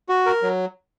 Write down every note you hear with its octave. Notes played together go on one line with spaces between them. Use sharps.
F#4
A#4
F#3